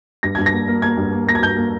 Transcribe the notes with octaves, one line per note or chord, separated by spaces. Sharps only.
G2 A#6
G2 G#6
A#6
A#3
A#3
A#3 G#6
G2
A#3
A#3 A#6
G#6
G2 G6
A#3